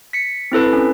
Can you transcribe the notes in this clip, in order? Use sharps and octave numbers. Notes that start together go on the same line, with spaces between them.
B6 C#7
C4 E4 A4 B4
C#4